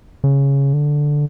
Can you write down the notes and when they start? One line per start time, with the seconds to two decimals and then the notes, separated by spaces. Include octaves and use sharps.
0.24 C#3
0.73 D3